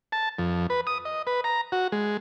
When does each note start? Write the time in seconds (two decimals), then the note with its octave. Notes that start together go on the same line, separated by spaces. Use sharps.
0.12 A5
0.39 F2
0.70 B4
0.87 D#6
1.05 D#5
1.27 B4
1.44 A#5
1.72 F#4
1.92 G#3